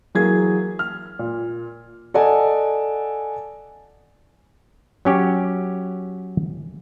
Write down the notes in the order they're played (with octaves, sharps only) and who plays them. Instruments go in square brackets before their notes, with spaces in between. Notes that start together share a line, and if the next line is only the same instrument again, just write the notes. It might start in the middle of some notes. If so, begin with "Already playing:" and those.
[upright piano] E3 F#3 A#3 G#4 G#6
F6
A#2
[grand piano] A4 D5 D#5 F#5 G#5 A5
[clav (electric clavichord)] F#3 C#4 G4